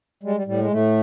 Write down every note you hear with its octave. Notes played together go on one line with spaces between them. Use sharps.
G3 G#3
G3
A2 G3
G#3
A2 A3